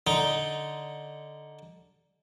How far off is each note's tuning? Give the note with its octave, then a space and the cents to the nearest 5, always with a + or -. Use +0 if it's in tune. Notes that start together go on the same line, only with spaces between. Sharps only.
D3 +0 D#4 +0